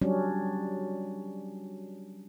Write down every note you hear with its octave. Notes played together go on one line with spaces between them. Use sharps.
F#3 G3 C#4 D4